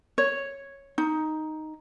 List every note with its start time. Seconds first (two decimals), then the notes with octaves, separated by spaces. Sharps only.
0.18 C#5
0.98 D#4